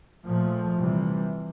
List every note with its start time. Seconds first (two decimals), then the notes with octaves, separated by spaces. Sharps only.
0.27 A#2 F3 A3
0.79 C3 E3 G3